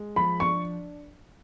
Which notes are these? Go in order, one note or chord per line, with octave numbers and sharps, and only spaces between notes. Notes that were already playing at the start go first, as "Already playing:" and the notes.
Already playing: G#3
F3 B5
D4 C#6